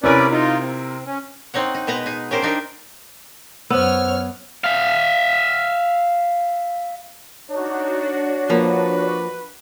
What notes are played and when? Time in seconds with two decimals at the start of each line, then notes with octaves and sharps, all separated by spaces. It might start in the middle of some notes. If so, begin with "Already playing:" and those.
0.03 C3 C#4 E4 A#4 B4 D5
0.31 D#4 F4
0.61 C4
1.06 C#4
1.54 C4 D#4 C#5 F#5
1.74 D#4
1.87 B2 G#3 B3 B4 A#5
2.06 D#4 G#4
2.31 C#4 G4 A#4 C5
2.42 D4 D#4 G4 A#4
3.70 F#2 B3 C5 C#5 E6 F6
4.64 E5 F5
7.50 D4 D#4 F#4 C#5
8.50 F3 A#3 B4